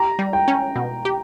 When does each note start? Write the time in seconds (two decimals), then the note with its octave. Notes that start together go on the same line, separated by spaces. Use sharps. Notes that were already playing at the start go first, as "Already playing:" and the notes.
Already playing: G4 A#5
0.19 G3
0.33 G5
0.48 C#4
0.76 B2
1.05 G4